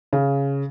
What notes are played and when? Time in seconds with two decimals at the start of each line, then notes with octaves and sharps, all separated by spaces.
0.13 C#3